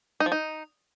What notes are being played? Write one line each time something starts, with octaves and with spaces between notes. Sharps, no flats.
D#4
F3
D#4